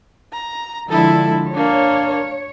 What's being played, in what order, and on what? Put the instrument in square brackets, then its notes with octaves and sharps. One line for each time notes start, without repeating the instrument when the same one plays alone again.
[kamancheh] A#5
[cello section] D3 F3 G#3 [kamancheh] E4 A4
[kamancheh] A#3 D4 [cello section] C#5